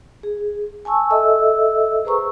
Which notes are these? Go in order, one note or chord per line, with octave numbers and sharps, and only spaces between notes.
G#4
G#5 A5 C#6 E6
A4 D#5 E5 E6
G#4 B4 C5 A#5 C#6 E6